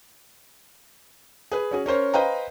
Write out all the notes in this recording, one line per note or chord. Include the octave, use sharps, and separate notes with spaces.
G#4 B4
C#4 F#4 G#4
C#4 A#4 C5 C#5
B4 C5 D#5 F5 G5 A#5